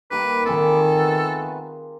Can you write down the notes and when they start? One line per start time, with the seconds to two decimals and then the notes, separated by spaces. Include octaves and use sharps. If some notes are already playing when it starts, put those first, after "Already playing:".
0.11 D#3 G3 A#3 B4 B5 D6
0.46 D#3 C4 F4 G#4 A4
0.98 A3 B3 B4